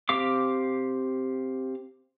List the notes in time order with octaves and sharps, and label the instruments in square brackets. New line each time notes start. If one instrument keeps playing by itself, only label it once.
[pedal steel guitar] C4 G4 F5 D6